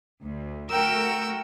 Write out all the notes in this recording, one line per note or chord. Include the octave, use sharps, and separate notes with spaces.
D2
A3 F#4 A#4 G5 E6